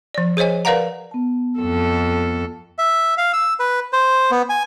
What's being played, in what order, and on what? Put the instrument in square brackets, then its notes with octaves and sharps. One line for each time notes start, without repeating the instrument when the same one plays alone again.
[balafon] F3 D5
G#4 C5 C#5 D#5 G#5
A#4 B4 D5 F5 F#5 A#5
[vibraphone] B3 A5
[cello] F2 A4
[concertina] E5
F5
E6
B4
C5
B3
G#5